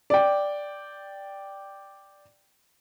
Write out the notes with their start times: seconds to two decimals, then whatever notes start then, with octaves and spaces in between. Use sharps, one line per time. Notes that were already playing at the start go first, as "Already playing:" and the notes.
0.10 D5 G5